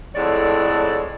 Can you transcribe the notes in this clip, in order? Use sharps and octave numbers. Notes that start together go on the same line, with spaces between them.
F2 A2 D3 G#3 C#5 D5